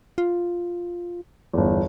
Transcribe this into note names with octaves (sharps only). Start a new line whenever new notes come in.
F4
G1 E2